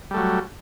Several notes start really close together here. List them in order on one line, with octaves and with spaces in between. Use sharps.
G3 A3 F#3